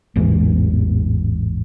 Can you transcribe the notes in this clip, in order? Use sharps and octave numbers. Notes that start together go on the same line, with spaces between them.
A1 E2 G#2